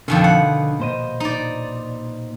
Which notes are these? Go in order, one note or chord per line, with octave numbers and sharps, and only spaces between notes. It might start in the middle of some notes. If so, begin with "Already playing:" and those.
F2 B2 D3 D#3
F#5
A#2 C5 D#5
D#4 D5